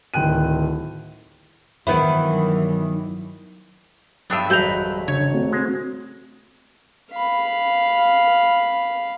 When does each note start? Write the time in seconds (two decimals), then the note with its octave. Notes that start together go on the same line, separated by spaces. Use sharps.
0.14 D1 D#3 G5 F#6 D#7
1.87 G2 D#3 E3 F#3 B3 E4
4.30 G2 F#3 B3 D4 G4 E5
4.50 G#1 F2 F#3 G3 B4 E5 A#5 G6
5.08 C#3 D4 C#5
5.34 A3 C4 F#4
5.52 G#3
7.13 F5 B5